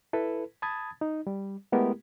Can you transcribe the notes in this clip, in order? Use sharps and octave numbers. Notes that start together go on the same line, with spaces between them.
E4 A4 B4
A5 B5 D#6 G#6 A6
D#4
G3
G#3 A3 B3 E4 G4 A#4